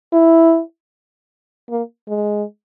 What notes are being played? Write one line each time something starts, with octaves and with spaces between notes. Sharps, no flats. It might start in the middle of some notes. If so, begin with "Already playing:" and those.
E4
A#3
G#3